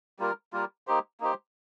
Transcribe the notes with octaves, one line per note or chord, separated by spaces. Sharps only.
G3 A#3 F4 A#4
G3 A#3 F4 A#4
A#3 D#4 G4 C5
A#3 D#4 G4 C5